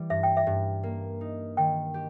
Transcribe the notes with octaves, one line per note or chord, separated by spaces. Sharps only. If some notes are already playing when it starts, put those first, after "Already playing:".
Already playing: E3 G3
G2 E5
G5
E5
G2
A#3
D#4
D#3 G5
G4